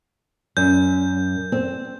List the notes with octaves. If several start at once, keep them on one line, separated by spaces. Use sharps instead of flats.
F#2 G6
C4